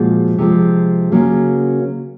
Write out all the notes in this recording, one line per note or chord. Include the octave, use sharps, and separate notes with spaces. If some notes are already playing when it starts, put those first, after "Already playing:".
Already playing: A#2 F3 G#3 F#4
C3 F3 G#3
C#3 F#3 A#3